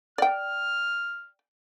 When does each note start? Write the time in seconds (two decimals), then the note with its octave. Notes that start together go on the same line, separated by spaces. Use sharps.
0.18 D5 G5 F6